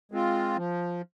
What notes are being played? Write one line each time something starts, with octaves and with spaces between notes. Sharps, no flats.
G#3 C4 F4
F3